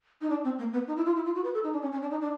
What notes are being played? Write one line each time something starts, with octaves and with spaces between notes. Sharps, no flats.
D#4
D4
C4
A#3
B3
D#4
E4
F4
E4
F4
F#4
B4
A4
D#4
D4
C#4
C#4
D4
D#4
D4